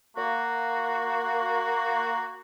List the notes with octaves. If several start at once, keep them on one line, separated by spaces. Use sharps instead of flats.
A#3 F#4